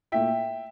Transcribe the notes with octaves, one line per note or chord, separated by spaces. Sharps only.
A#2 A3 E4 E5 G5